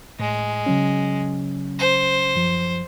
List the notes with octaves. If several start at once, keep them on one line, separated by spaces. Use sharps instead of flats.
A2 G#3
C#3 F#3 C#4
C5
F#2 F3